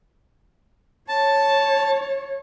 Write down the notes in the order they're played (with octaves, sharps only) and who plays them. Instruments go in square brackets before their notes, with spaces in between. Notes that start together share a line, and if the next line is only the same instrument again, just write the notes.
[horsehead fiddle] C#5 [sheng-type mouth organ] A5